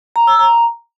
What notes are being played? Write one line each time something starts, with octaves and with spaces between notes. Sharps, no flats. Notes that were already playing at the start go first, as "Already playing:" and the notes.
A#5
E6
A#5